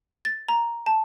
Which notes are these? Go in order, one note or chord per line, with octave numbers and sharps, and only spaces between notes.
A6
A#5
A5